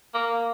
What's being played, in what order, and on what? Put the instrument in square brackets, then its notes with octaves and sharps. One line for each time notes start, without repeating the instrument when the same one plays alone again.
[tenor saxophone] A#3